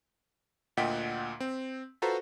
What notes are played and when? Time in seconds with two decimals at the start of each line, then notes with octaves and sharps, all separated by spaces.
0.77 D2 A#2 D#5 F#5 G5 B6
1.40 C4
2.02 F4 F#4 A4 B4 C5 A#5